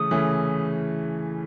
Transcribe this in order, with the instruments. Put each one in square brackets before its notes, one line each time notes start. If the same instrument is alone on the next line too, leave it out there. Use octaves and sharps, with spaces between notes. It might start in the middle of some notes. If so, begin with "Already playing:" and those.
Already playing: [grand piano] C#3 E3 A3 C#4 [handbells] D#6
[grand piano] C#3 E3 A3 C#4